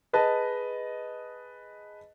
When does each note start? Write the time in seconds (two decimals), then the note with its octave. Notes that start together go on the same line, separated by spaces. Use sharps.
0.13 G#4 B4 D#5 A5